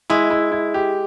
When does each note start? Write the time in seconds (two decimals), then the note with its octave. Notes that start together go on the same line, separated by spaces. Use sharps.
0.10 G#3 E4
0.30 E4
0.52 E4
0.74 G4